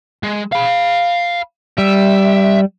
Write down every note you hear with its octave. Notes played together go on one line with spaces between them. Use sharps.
G#3
F5 B5
G3 E5